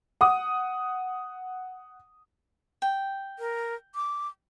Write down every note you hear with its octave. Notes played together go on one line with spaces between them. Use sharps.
F#5 D#6
G5
A#4
D6